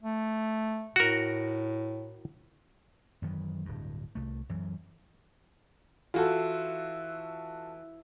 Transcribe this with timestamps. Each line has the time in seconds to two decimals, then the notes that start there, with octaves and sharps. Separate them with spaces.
0.03 A3
0.96 A2 F#4 A#4
3.22 F#2 D#3 E3
3.65 D1 G2
4.15 C2 A3
4.49 F#2 E3
6.14 E3 F4 F#4 A4